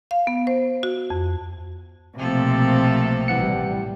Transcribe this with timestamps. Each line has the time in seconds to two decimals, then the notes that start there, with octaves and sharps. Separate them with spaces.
0.11 F5
0.27 B3
0.47 C5
0.83 F#4
1.10 F2
2.18 B1 C3 F3 A3 A#3 C4 A4
3.28 A1 E3 G3 F#5 C#7